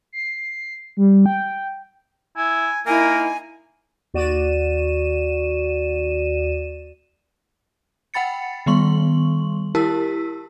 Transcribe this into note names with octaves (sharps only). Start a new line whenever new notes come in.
C7
G3
G5
E4 G#5
A#3 D#4 E4 A#4 G#5
D#2 F#4 D5 D#7 E7
F#5 G5 B5 A6 C#7
D#3 G3 B3 C6 C#6 F#7
E4 G4 A#4 A5 E6 B6